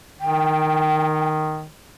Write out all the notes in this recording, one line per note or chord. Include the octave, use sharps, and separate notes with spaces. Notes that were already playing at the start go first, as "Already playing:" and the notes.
D#3 G5